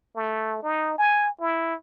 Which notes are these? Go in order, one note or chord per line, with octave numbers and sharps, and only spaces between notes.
A3
D#4
G#5
E4